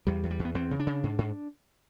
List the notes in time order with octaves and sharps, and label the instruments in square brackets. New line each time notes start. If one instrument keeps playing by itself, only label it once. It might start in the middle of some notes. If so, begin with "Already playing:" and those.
[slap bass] E2 G3
E2
G3
E2
B3
E2 C4
C#3
D4
C#3
G#2
G#2